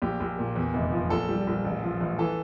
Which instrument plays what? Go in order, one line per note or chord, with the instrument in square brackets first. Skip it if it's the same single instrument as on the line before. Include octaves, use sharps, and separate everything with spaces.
[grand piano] A#1 G4
A#1
A#2
E2
F1
F3
A#1 A4
G3
A#1
A1
F3
A1
E3 A4